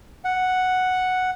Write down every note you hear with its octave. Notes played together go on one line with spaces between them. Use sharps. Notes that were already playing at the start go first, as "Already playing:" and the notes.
F#5